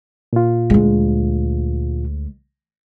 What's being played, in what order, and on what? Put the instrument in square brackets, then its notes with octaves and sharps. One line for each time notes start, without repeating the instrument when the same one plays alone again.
[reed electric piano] A#2 F4
[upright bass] D2 G#3